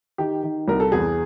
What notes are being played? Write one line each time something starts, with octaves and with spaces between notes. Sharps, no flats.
D#3 G4
D#3
C2 A#4
A4
E2 G#4